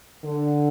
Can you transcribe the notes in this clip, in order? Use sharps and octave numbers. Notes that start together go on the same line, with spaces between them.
D3